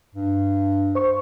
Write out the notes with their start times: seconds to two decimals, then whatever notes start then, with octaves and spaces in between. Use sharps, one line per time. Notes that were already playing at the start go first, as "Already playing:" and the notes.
0.15 G2
0.95 C5 C#6